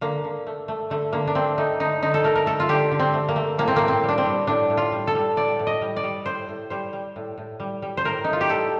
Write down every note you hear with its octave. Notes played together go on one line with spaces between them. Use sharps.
D3 A#3
D3
A3
A3
D3 A3
D3 A#3
D4
A3 C4
A3 D#4
D3 D#4
D3 D#4
A4
A3 A#4
A#4
A3 A4
F4
D3 G4
D3
C4
A3
A#3
A3
A2 A#3
C4
A2 A#3
C4
G3
D4
C4
G3
A2 D4
A2
F4
G3
A4
G3
A2 D5
A2
D#5
G3
D5
G3
A2 C5
A2
G3 C5
G3
A2
A2
G3
G3
C5
A2 A#4
A2 D#4
F4
G4
G3 A4